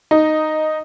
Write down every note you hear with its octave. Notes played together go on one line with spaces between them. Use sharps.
D#4